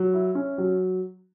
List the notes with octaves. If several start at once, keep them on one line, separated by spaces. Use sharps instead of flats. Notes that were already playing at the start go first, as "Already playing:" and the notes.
Already playing: F#3
E4
C#4
F#3